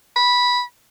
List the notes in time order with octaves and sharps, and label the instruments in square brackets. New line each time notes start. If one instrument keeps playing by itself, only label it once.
[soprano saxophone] B5